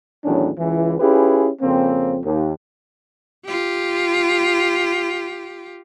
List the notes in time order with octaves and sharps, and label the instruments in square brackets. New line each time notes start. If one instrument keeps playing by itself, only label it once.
[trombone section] E2 A2 D#3 F#3 C#4 D4
C#2 E3
C#4 E4 F4 G4 G#4 B4
F2 C#3 A#3 C4
D#2
[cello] F4 G4